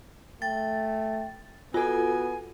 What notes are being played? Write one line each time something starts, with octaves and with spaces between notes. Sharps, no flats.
A3 G5 A6
B3 F4 F#4 A4 G#5